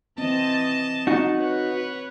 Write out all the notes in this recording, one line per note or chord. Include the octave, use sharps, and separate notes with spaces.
E3 C4 D#5 A5
D#4 F#4
B4 C#5 F#5